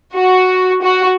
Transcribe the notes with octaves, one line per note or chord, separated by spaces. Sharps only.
F#4
F#4